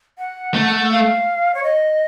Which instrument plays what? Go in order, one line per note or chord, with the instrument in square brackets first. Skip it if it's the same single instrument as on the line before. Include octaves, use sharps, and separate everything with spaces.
[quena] F#5
[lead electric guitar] A3
[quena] F5
C#5
D#5